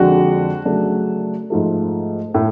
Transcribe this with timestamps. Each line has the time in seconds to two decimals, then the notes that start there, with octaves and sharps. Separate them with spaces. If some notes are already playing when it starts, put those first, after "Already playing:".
Already playing: F2 D3 G#3 D4 F#4
0.65 C#3 F#3 A3 D4
1.50 G#2 F3 A3
2.34 A2